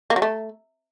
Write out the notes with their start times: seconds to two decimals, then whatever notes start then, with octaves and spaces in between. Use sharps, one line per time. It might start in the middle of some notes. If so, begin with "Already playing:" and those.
0.10 A#3
0.16 F#3
0.22 A3